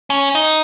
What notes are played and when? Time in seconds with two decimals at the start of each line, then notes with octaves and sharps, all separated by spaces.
0.10 C#4
0.35 D#4